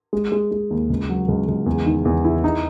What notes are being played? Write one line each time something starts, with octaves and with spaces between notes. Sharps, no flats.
G#3
G#3
G#3
D#2
C#2
F#3
C#2
C#2
E2
D#3
E2
E4
D#4